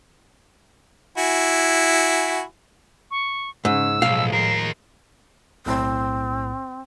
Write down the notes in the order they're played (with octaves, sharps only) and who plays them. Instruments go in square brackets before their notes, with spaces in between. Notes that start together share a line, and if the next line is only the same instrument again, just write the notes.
[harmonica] E4 F#4 G#5
[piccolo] C#6
[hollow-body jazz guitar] G#2 [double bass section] C#3 C#4 [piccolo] E6
[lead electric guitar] B1 [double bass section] A2 F3 G#3 [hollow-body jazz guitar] F5
[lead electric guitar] D#2 A#4 [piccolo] C7
[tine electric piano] B1 A2 [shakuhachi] C4